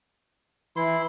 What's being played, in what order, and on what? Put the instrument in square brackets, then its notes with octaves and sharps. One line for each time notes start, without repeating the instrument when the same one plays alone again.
[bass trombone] E3 [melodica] E4 C6